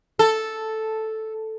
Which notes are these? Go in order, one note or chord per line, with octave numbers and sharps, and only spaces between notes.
A4